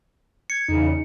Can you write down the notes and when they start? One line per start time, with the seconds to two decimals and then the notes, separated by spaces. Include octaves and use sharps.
0.50 G#6 C#7
0.68 E2 C#3 D#4